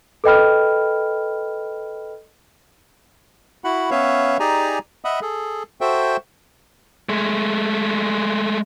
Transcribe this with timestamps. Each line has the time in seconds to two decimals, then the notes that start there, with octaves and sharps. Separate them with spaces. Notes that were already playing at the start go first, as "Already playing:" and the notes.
0.24 A4 B4 D#5 G5 B5 F6
3.64 E4 F#4 F#5 B5
3.91 B3 C#4 B4 C#5 E5 F5
4.40 D#4 G4 G#4 D5 G#5 A#5
5.05 D#5 E5 F#5 B5 D#6
5.22 G#4 A4
5.81 F#4 A4 C5 E5 G5
7.09 G#3 A3